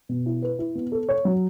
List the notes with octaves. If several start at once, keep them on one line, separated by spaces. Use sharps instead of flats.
B2
E4
B4
E4
B3
A4
C#5
F#3